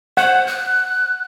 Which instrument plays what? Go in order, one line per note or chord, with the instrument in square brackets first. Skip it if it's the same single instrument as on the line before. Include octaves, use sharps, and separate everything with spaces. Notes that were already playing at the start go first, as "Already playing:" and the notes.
[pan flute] C5 [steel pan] F#5
[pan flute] F#6